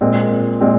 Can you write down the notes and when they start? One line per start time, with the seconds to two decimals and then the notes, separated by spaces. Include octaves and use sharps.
0.01 A#2 G#3 C4
0.61 A#2 G#3 C4